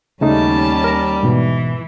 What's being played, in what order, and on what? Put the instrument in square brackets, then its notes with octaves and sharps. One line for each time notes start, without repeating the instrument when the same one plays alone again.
[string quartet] D#2 C#4 A5 [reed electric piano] C#3 A3 D#4 [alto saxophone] G3
[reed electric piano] A#4 A#5
[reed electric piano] G#2 B2 [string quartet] E3